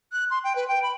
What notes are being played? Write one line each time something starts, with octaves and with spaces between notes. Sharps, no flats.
F#6
C6
G5
B4
G5
B5